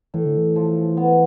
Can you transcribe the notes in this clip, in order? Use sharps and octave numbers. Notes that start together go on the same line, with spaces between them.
A2 E3
D3
E3
F3
B3